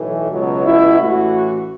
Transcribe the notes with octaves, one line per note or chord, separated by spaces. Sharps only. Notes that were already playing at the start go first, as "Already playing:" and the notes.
Already playing: B1 A2 E3
C#2 B2 F#3
E4
A1 A2 E3 F#4